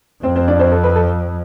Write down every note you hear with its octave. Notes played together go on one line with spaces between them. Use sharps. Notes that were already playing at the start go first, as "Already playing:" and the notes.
F2 C4 C5
C4 C5
D4 D5
C4 C5
A4
B4
A4